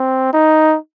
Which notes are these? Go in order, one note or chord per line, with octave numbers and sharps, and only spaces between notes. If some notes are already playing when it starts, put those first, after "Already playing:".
Already playing: C4
D#4